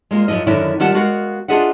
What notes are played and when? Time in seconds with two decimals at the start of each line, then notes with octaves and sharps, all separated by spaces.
0.11 G#3 A#3 F4
0.28 F#2 C#3 F3 E4 D#5
0.47 F#2 D3 D#3 F#3 D4 E4
0.80 D#3 G3 F4 F#5 A5
0.94 G#3 B3 F#4 A#4 F5 F#5
1.48 D4 F4 G#4 D#5 E5 F#5